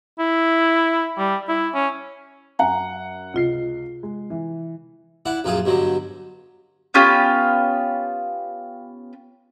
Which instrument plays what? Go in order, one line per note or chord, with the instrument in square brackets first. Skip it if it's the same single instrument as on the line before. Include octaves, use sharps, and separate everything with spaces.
[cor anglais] E4
G3
E4
C#4
[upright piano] F#2 F#5 [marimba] G#5 A#5
[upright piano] C#2 D#5 C7 [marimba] C3 F4
[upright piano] G#3
E3
[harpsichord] E4 D5 F#5
A#1 F#2 F4 G#4 A4
G2 B2 D3 F#3
[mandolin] B3 C#4 F4 G4